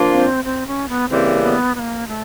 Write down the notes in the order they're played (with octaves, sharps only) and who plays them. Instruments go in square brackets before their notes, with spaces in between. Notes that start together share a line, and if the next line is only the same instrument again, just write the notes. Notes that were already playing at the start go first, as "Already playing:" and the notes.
Already playing: [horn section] F3 A#3 D4 F4
[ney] C4
C4
C#4
B3
[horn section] C#3 E3 G3 A#3 [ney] C4
[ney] B3
B3
A#3
A3